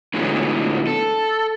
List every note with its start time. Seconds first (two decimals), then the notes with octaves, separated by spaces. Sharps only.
0.14 A2 D3 E3 F#3 G#3 B3
0.87 A4